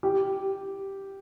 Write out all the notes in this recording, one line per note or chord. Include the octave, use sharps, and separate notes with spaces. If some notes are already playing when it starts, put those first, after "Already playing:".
G4